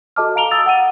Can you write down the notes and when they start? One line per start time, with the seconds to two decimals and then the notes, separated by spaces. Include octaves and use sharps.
0.16 F#4 A4 D#5 A5 D6 F6
0.36 F5 A#5 D7 F7 G7
0.51 D#6 E6 A6 F7
0.66 F#5 D#7